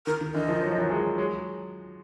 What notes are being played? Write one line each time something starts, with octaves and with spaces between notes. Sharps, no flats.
D#3 A#4
D#3
D3 E3 D#5
D#3 F3
F#3
F3
E3 F#3
F#3 G#3
F#3 G#3